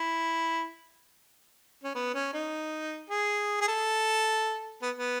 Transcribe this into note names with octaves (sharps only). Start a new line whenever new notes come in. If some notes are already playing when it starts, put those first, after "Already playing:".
Already playing: E4
C#4
B3
C#4
D#4
G#4
G#4
A4
B3
B3